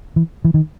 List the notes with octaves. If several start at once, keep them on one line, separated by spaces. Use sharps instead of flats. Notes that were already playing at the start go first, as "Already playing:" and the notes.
E3
E3
D#3